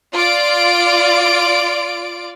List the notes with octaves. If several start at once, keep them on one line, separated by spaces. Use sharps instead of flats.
F4 D5 D7